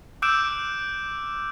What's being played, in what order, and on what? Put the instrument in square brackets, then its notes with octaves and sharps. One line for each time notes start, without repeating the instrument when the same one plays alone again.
[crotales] D6 E6 F#6 G6 D7 E7